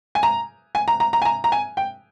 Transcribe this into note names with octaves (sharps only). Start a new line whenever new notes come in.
G#5
A#5
G#5
A#5
A#5
A#5
G#5
A#5
A#5
G#5
G5